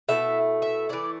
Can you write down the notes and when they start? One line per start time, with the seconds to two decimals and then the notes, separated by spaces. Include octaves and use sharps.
0.08 B2 A3 E4 E5
0.62 E5
0.89 E3 A3 E4 D5